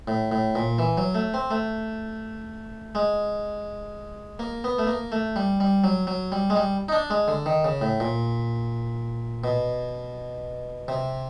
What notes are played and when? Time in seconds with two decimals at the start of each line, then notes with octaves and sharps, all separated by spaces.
0.08 A2
0.32 A2
0.55 A#2
0.79 E3
0.97 F#3
1.15 A3
1.34 C4
1.51 A3
2.95 G#3
4.39 A#3
4.64 B3
4.78 A3
4.87 A#3
5.12 A3
5.36 G3
5.60 G3
5.84 F#3
6.07 F#3
6.32 G3
6.50 G#3
6.56 G3
6.89 D#4
6.92 D4
7.10 G#3
7.28 D3
7.46 D#3
7.64 C#3
7.81 A2
8.00 A#2
9.44 B2
10.88 C3